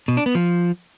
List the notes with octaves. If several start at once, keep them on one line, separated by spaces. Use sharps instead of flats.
B2
D4
B3
F3